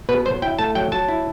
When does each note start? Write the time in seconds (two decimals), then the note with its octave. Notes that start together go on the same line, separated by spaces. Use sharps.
0.09 B2 B4
0.25 F#3 C5
0.42 E4 G5
0.59 A3 A5
0.75 F#3 G5
0.92 F#3 A5
1.09 E4